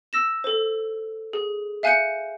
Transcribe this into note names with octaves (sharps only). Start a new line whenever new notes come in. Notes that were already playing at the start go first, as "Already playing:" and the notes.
E6 A#6 E7
A4 C5
G#4
E5 F5 G#5 F#6 G6 C#7